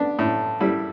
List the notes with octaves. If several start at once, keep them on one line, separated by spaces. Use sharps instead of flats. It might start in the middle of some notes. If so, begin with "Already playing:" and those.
Already playing: B3 D4
A2
G3 E4